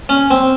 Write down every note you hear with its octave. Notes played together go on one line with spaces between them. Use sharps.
C#4
C4